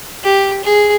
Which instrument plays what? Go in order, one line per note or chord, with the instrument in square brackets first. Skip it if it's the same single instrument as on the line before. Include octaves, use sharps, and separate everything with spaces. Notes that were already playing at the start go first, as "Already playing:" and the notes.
[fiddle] G4
G#4